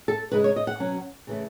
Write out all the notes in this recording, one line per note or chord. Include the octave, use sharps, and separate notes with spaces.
A4
C#3 G#3 D#4 B4
C#5
D#5
F#5
B2 F#3 C#4
C#3 E3 A3 C#4